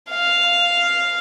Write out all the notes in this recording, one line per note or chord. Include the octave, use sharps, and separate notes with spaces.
F5